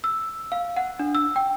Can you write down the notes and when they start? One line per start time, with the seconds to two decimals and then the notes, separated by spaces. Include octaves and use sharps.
0.04 E6
0.52 F5
0.76 F#5
0.99 D4
1.15 E6
1.36 G5